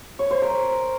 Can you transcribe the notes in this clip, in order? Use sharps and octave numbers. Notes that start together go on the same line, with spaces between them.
C#5
C5
A#4